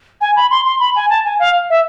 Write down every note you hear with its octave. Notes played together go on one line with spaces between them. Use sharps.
G#5
B5
C6
C6
B5
G#5
A5
G#5
F5
E5